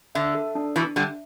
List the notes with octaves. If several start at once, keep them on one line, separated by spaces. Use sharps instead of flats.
D3 E5
A4
D4
B2 E3 D4
D3 G3 E5